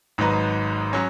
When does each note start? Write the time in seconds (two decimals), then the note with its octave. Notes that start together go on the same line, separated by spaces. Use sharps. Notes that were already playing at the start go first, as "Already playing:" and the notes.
0.18 G#1 G#2 F#3 D#4 B4
0.93 F#3 C#4